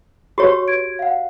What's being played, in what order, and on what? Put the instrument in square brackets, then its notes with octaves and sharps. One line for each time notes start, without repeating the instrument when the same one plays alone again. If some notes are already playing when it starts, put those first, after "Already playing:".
[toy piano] F#4 G4 C#5 [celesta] B4 C#6
[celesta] G#6 D7
F5 F#5